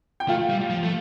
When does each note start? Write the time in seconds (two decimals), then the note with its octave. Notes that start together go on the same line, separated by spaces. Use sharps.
0.20 G5
0.28 A3 F4 F5
0.50 G3
0.70 F3
0.83 A3